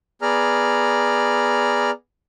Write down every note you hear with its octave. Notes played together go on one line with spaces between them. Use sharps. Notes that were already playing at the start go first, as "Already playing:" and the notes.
B3 G#4 D5 A#5 F6